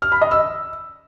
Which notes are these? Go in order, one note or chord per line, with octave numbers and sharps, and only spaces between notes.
F6
B5
D#5
E6